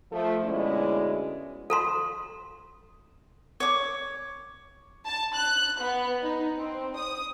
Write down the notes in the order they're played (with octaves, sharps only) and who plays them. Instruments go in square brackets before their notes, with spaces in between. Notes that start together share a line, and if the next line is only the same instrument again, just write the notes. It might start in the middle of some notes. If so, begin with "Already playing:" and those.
[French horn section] F3 A3
D2 B2 G#3 C#4 E4 D5
[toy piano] A4 A#5 C6
[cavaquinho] C#5 D6
[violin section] A5
F#6
B3
D#4
C4
D#6